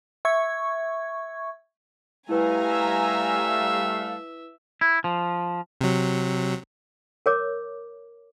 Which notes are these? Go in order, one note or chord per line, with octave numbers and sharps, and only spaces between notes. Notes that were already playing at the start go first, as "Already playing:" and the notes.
E5 C#6 G#6
G3 A3 E4 B4 F5 G#5 A#5
E5
E4
F3
C3 F#3
A#4 C#5 D6